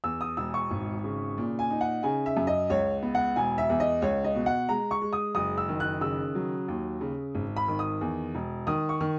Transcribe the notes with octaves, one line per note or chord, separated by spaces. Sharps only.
E2 E6
D#6
E1 E6
C#6
G#1
C#3
A#2
G#5
D#4
F#5
C#3 G#5
E5
F#2
D#5
C#2 C#5
B3
F#5
E1 G#5
E5
E2
D#5
C#2 C#5
D#5
B2
F#5
G#3 A#5
C#6
G#3
D#6
F#1 D#6
E6
D#3
F#6
C#3 E6
F#3
D#2
C#3
G#1
B5
D#3
D#6
E2
E1
D#3 D#6
C#6
D#3